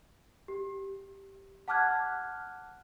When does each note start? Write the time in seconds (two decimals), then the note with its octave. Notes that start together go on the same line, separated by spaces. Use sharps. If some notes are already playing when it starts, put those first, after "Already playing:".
0.48 G4
1.68 F#5 A5 D6 F6 F#6 G#6